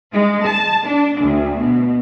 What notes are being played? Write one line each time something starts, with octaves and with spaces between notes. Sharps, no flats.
G#3
A5
D4
D2
B2